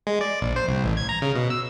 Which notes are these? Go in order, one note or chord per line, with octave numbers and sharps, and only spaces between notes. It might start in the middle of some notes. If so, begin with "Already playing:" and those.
G#3
D5
A#1
C5
C2
A1
G#6
A#5
C#3
B2
E6